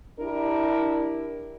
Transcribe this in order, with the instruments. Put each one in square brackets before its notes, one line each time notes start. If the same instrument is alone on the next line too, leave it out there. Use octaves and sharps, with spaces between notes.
[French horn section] D4 E4 G4 A#4